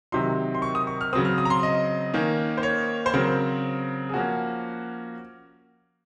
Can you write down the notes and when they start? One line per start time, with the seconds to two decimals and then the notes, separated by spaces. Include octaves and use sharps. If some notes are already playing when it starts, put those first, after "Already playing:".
0.12 C3 D#3 F#3 C6
0.55 C6
0.62 C#6
0.75 D#6
0.87 C#6
1.01 F6
1.13 C#3 F#3 C4 D#6
1.25 F6
1.38 D#6
1.45 A#5
1.50 C6
1.63 D#5
2.13 D#3 A#3 C#4
2.57 C5
2.63 C#5
3.06 C5
3.14 C#3 F#3 C4 A#4
4.09 G#4
4.13 F3 A#3 C#4 F#4